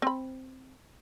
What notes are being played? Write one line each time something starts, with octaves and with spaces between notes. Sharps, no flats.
C4 B5